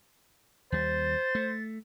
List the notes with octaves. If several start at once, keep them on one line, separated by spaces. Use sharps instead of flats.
D#2 G3 C5 A6
A3